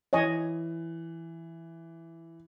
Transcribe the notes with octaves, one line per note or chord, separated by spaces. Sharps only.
E3 C#5 D#5 G#5